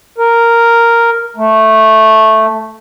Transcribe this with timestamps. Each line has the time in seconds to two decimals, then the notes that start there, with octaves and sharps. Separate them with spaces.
0.18 A#4
1.37 A3